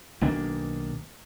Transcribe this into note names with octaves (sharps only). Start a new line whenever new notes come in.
B1 D#3 A#3 D4